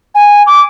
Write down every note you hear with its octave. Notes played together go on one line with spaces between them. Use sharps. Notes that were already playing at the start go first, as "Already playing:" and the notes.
G#5
D6